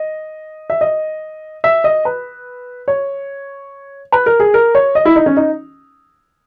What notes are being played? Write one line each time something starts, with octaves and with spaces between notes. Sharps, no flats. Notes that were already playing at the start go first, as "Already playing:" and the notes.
Already playing: D#5
E5
D#5
E5
D#5
B4
C#5
B4
A#4
G#4
A#4
C#5
D#5
E4
D#4
C#4
D#4